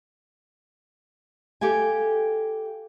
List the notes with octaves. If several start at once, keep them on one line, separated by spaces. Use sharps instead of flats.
G4 A4 F5 G#5